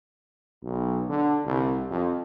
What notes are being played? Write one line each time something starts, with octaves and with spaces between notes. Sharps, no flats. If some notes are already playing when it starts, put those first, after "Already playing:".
B1
D3
C2
F2